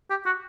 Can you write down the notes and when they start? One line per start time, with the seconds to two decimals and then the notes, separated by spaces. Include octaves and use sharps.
0.10 G4
0.26 F#4